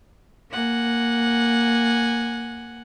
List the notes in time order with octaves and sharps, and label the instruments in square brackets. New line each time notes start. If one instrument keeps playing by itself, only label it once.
[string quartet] A#3 F#5 G#5